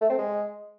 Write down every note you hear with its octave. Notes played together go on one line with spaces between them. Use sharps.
A3
C4
G#3